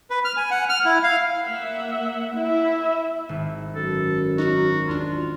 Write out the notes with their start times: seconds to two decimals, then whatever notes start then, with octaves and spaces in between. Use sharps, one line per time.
0.10 B4
0.25 F6
0.37 G#5
0.51 F#5
0.69 F6
0.85 E4
1.04 F5
1.42 A#3 E5 F#5
2.37 E4 E5
3.29 G#1
3.75 F#2 A4
4.38 D#4 F#4 A#4
4.88 E2 D4 F4